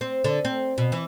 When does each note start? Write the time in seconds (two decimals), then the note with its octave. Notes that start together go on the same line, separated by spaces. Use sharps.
0.01 C4
0.24 D3
0.45 C4
0.78 B2
0.92 E3